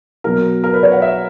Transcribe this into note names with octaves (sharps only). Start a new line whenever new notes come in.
B2 F#3 A#4
A#4
B4
C#5
F#5
E5